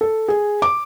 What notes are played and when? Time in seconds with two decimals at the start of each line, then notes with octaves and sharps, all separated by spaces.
0.01 A4
0.28 G#4
0.62 D6